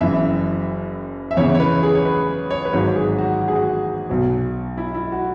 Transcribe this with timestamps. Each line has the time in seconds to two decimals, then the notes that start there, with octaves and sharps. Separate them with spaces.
0.01 F#1 F#2 E3 E5
1.31 E5
1.37 E2 C#3 E3 C#5
1.55 C#5
1.60 B4
1.83 G#4
1.95 C#5
2.05 B4
2.51 C#5
2.65 B4
2.73 G#1 G#2 F#3 C#5
2.95 G#4
3.18 F#4
3.41 F#4
3.48 G#4
3.56 F#4
4.09 B1 B2 F#3
4.78 E4
4.94 E4
5.12 F#4